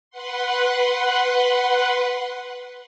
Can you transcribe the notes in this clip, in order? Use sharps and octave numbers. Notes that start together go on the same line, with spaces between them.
B4 F#5 C6